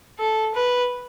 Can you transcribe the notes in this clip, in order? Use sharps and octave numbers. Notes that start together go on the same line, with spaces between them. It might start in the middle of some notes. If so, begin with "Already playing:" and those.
A4
B4